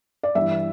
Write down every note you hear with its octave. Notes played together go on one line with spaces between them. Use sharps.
D5
G2 E3 E5